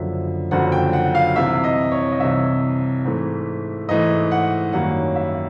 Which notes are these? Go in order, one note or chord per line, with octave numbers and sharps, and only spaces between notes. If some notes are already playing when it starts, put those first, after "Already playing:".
Already playing: F#1 F#2 D3 F3 E5
F#1 F#2 D3 F3 F#5
G5
F#5
F5
C2 C3 E3 E5
D#5
C#5
D#5
C2 C3 E3 E5
G#2 E3 A3
G#2 E3 A3 D#5
F#5
F#2 D#3 G3 A#3 C#4 F#5
E5